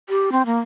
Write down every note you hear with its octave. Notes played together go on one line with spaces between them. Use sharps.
G4
C4
A#3